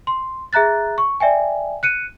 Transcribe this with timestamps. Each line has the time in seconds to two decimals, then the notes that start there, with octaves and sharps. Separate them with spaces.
0.07 C6
0.53 G#4 E5 A#5 F#6 A6
0.98 C#6
1.20 D5 E5 G5 G#5
1.83 F#6 C#7 D#7